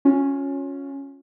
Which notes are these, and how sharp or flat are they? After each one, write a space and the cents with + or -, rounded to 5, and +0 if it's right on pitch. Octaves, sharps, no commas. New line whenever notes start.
C#4 +0 F4 +35